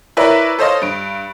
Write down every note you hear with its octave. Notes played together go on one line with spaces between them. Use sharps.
E4 A#4 B4 C#5 D5 E5
A4 C5 C#5 D#5 F5
G2 D7